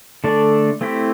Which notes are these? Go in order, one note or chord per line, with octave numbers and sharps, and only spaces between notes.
D3 A3 D4 A4 D5
A3 C4 E4 G4